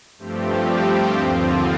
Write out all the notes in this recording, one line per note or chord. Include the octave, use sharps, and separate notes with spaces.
G2 F3 A3 C4 G4
D#2 D3 F3 C4 F4